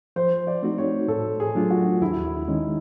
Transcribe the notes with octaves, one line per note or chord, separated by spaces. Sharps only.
F3 C5
D5
A3 C4 D#4 F#4
C#5
A2 A4
G#4
F#3 A3 D4 F4
F#4
D#2 E4
E4
D#3 G#3 C#4 D#4